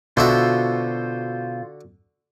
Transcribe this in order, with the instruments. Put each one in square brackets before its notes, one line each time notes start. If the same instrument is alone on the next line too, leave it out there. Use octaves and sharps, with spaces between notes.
[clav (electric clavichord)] B2 [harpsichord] D3 F#4 E5 [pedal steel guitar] F4 C5